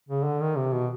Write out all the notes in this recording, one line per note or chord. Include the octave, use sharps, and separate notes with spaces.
C#3
D3
D#3
C3
B2